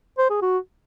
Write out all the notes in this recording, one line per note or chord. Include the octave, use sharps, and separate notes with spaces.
C5
G#4
F#4